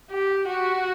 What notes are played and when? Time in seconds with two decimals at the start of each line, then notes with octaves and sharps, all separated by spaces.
0.11 G4
0.48 F#4